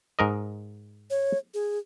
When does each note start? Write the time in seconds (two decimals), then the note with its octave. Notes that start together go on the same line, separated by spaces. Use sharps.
0.19 G#2 A#4 D#5
1.10 C#5
1.54 G#4